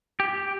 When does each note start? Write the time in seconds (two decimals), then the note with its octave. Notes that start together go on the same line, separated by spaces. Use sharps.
0.20 G4